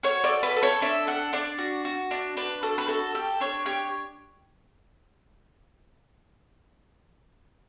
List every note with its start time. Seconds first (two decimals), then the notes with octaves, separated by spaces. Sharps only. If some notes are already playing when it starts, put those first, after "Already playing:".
0.03 F#4 C#5
0.24 D5
0.29 A4
0.43 B4
0.56 A4
0.63 C#5
0.82 D4 E5
1.07 A4 F#5
1.33 D4 D5
1.59 F#4
1.85 F#4
2.11 D4
2.37 D4 B4
2.63 F#4 A4
2.78 B4
2.88 F#4 A4
3.15 G4 A4
3.41 D4 C#5
3.66 G4 C#5